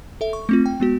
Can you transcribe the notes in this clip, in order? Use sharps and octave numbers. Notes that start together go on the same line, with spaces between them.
A4 E5
C#6
A3 C4 F4
G5
G#3 B3 F#4